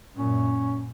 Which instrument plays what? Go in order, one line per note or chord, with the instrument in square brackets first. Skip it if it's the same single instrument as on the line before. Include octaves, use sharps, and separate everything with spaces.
[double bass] F#2 A#2 [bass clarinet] C#4